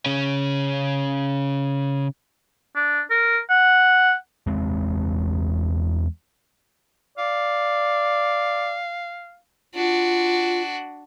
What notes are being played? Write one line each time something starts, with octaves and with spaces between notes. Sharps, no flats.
C#3 C#4
D4
A#4
F#5
E2 G#3 C4
D5 F5
D4 F4 F#4